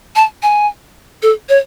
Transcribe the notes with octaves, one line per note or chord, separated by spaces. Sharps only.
A5
G#5
A4
C#5